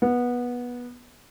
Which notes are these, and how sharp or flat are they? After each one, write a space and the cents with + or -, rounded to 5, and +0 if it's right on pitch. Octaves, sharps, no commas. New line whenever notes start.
B3 -15